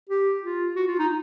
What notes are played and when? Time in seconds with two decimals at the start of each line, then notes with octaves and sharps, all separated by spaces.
0.09 G4
0.43 F4
0.76 F#4
0.87 F4
0.99 D#4